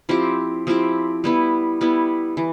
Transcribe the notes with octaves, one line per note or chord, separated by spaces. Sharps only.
F3 C4 E4 G4
F3 C4 E4 G4
G3 B3 E4
G3 B3 E4
E3